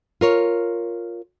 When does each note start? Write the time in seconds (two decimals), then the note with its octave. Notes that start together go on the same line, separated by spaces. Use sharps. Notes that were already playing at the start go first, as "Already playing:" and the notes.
0.21 F4 A#4 C#5